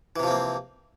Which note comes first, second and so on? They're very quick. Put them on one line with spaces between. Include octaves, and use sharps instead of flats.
E3 C3 F3 C4 A#3